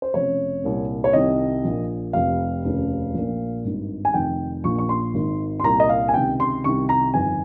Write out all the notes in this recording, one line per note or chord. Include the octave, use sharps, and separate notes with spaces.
C5
F1 F2 C#3 C#5
C2 A#2
C#5
C2 C3 D#3 D#5
A#1 A#2
F1 F2 C3 F5
F1 D#2 C#3
A#1 A#2
G#1 G2 D#3
G#5
F1 F2 D#3 G5
A#1 A#2 C#6
C#6
C6
G#1 G#2 D#3
C6
C2 A#2 A#5
D#5
F5
G#5
C#2 C3 D#3 G5
C6
C2 C3 D#3 C#6
A#5
G1 F2 D#3 G#5